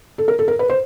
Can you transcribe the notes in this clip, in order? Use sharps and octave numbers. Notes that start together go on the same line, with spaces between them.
A4
A#4
A4
A#4
B4
C5